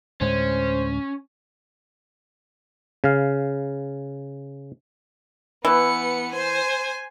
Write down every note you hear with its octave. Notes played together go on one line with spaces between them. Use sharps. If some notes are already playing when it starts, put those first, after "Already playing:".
D2 A2 G#3 C#4 C5
C#3 F5
E3 B3 C#7
C5 G#5